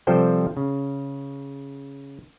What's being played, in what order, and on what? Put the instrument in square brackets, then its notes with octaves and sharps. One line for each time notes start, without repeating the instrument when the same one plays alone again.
[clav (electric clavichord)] C3 F3 G3 A4 C5 G5
C#3